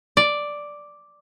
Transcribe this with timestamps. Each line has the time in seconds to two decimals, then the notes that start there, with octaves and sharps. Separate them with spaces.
0.17 D5